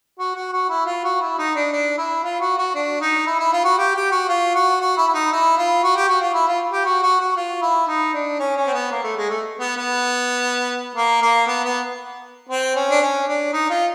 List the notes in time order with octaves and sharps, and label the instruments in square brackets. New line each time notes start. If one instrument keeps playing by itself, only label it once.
[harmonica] F#4
F#4
F#4
E4
F4
F#4
E4
D#4
D4
D4
E4
F4
F#4
F#4
D4
D#4
E4
E4
F4
F#4
G4
G4
F#4
F4
F#4
F#4
E4
E4
D#4
E4
F4
F#4
G4
F#4
F4
E4
F4
G4
F#4
F#4
F#4
F4
E4
D#4
D4
C#4
C#4
C4
B3
A#3
A3
G#3
A3
B3
B3
A#3
A#3
B3
B3
C4
C#4
D4
C#4
D4
D#4
F4